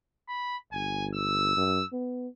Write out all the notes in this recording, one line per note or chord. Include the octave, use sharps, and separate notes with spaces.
B5
G1 G#5
E6
F#2
B3